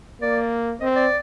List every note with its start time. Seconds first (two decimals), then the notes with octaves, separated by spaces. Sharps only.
0.21 A#3 D5
0.81 C4 D#5
0.96 D5